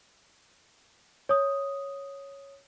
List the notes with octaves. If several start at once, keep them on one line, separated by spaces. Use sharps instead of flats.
C#5 D#6